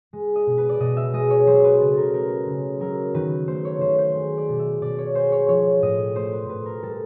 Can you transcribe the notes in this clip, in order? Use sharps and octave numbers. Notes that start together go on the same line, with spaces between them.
G#3
D#5
B2
B4
D5
B2 D#5
E5
G#3 D#5
C#5
F#3 C5
B4
C#3 A4
A#4
A3 A#4
C#3
F#3 A#4
D#3 B4
A3 C5
C#5
D#3 C5
C5
G#3
D5
B2
E5
B2 D5
C#5
G#3 C5
C#5
F3 C#5
A2 D#5
A3 C5
B4
A2 B4
A#4
G3 A4